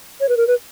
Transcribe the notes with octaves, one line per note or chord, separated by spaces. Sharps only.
C#5
B4
A#4
B4